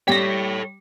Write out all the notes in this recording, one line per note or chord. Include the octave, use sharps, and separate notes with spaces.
G3 G4 A4 C#5 A#6 B6